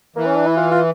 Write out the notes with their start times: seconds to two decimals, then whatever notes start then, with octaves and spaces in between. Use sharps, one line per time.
0.16 E3 A#3
0.26 C#4
0.36 D4
0.46 E4
0.57 F4
0.71 F4